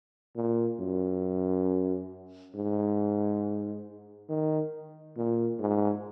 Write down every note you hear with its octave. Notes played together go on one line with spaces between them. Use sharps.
A#2
F#2
G#2
D#3
A#2
G#2